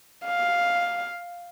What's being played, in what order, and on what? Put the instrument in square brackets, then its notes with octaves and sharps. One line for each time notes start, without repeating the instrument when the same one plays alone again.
[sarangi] F5